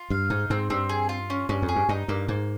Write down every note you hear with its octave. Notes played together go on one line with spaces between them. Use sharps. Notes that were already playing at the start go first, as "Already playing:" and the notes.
Already playing: F4
G2 F5
G#2 D#4
G#2 C4
G2 C4
G#4
F4
C#4
G2 C#4
F2
G#4
G2
G2 D#4
G2 A#3
G#2 A#3